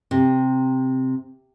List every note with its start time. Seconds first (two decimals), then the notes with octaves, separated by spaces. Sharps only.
0.11 C3